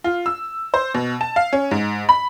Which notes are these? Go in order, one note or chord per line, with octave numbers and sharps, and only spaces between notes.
F4
E6
C5
B2
A5
F5
C#4
G#2
B5